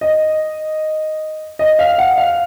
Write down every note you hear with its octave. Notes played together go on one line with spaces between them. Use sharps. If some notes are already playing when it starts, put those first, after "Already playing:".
D#5
D#5
F5
F#5
F5